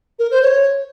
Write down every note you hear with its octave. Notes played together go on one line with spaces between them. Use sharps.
A#4
C5
C#5